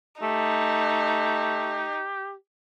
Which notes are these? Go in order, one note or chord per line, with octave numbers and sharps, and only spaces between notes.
A3 D#4 G4